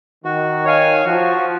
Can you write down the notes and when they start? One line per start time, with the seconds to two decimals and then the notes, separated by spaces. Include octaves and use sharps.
0.25 D#3 F#4
0.65 C#5 F5 G#5
1.05 F3 F#4